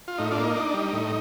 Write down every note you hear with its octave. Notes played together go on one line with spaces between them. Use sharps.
F4
A2 D#4
D4 F4
A#3
D#4
D4
G3
A2